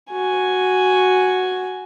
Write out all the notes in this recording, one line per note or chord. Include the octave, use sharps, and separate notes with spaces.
F#4 G#5